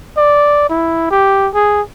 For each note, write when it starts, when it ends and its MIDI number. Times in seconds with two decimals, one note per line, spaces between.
0.18 0.68 74
0.70 1.08 64
1.11 1.48 67
1.54 1.82 68